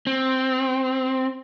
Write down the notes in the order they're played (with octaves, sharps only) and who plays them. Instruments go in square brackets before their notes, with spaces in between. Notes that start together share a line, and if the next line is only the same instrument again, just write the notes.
[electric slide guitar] C4